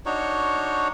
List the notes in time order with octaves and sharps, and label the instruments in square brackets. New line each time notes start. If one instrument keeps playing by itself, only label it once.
[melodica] D4 D#4 F#4 C#5